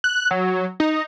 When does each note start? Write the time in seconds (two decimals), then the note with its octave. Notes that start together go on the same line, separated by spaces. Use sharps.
0.04 F#6
0.31 F#3
0.80 D#4